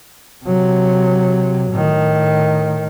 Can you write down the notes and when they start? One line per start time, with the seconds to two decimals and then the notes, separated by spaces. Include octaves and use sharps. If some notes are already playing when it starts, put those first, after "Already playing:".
0.45 C3 F#3
1.72 A2 D#3